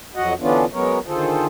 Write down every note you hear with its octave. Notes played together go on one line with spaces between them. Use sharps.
F2 F#3 F#4 D#5 F#5
D3 E3 B3 C#4 D4 F4
F#3 G#3 B3 C#4 A#4 C#5
D3 D#3 F4 G#4 A4 C5